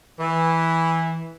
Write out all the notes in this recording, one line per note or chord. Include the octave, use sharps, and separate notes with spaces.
E3